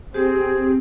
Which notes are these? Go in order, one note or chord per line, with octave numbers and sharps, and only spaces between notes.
C4 G4 G#4